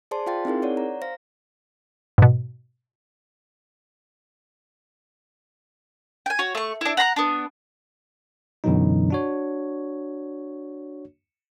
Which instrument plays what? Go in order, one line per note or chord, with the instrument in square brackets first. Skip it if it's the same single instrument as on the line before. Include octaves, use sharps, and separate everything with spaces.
[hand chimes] G#4 C5 D5 A5 C6
F4 F5 G5 C6 A6
C4 D#4 E4 G#4 A#4
C#5 D5 F#5
A#5
C5 F5 A#6
[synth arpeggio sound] G#2 B2
[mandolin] G5 G#5
F#4 C#5
A3 C#6
D4 E4
F#5 A#5 B5 F#6
B3 D4
[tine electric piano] F#2 B2 D3 E3 F#3 D#4
D4 F#4 C#5